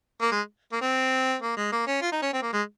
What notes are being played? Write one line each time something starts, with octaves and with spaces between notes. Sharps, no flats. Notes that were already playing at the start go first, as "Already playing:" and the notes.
A#3
G#3
A#3
C4
A#3
G#3
A#3
C#4
F4
D#4
C#4
C4
A#3
G#3